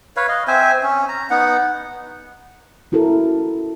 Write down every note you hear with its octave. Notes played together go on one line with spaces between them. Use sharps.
B4 C#5 F5
D#5 F5
C4 C5 E5 G#5
C#4
A#5
B3 D#4 F#5
C#4 E4 F#4 A4 A#4